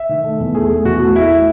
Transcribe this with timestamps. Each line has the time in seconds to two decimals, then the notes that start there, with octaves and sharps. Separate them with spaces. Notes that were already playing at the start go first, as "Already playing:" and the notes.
Already playing: E5
0.09 D#3
0.24 A3
0.40 E2
0.55 A3 G#4
0.70 A3
0.85 E2 F#4
1.00 A3
1.15 A3 E4